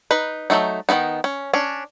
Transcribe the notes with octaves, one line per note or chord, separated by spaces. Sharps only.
D#4 B4
F#3 G#3 A3 D#4
D#3 F#3 B3 D#4
C#4
C#4 D4